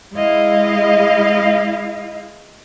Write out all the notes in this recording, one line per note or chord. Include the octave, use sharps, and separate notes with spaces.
G#3 E4 D#5 F5